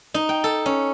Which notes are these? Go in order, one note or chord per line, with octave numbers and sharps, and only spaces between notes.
D#4
G5
A4
C#4